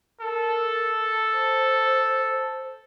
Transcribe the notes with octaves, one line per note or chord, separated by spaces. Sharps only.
A4 A#4
C5